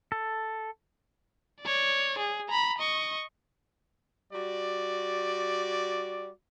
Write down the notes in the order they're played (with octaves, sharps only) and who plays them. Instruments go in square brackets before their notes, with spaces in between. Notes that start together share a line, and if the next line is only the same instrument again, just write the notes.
[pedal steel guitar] A4
[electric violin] C#5 D5
G#4
A#5 B5
D#5 C#6
[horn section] G3 F#4 D5